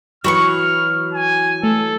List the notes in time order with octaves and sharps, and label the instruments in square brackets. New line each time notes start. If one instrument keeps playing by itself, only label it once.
[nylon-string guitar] E3 F#3 [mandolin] F#4 B5 C#6 [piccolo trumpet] F6
[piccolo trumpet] G#5
[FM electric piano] A3 [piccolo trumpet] A4